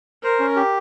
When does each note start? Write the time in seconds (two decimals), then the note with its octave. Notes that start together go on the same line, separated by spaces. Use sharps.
0.23 A#4 C5
0.40 C#4
0.56 G4